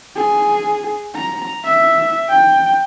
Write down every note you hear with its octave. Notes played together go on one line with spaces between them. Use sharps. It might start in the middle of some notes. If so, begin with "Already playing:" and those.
G#4
A#5
E5
G5